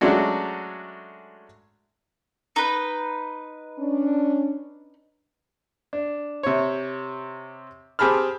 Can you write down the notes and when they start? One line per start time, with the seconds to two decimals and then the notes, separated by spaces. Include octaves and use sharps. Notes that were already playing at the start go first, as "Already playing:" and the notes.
0.01 F#3 G#3 A3 C#4 D4 F#4
2.56 D#4 B4
3.78 C#4 D4
5.93 D4
6.43 C3 C#5
7.99 C4 G4 G#4 A5 B5 F6